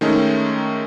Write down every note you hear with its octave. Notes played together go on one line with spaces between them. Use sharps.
D#3 G#3 A3 C#4 D#4